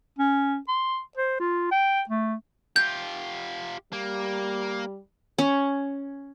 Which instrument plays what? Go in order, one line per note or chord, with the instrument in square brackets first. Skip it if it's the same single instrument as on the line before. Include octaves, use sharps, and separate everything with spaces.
[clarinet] C#4
C6
C5
F4
G5
A3
[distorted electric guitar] F4 G4 [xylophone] G6
[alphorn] G3 [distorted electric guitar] A#3
[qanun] C#4